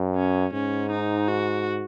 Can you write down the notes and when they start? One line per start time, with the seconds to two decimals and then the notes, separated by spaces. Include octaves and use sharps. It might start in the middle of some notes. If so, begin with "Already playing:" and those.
Already playing: F#2
0.16 C#4
0.53 G#2 C#4
0.91 D#4
1.28 F#4